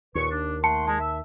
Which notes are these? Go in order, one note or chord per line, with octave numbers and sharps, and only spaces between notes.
D#2 A#2 B4 C#6
D4
A3 F#5 A5 C6 C#7
G#3 A5
E5